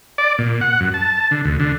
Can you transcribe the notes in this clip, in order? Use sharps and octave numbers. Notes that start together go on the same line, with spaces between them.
D5
A#2
F#5
F#2
A5
D3
D2
D3